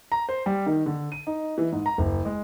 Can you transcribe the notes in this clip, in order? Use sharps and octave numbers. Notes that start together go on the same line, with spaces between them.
A#5
C5
G3
D#3
D3
D#7
D#4
E3
G#2
A#5
F#1
G#3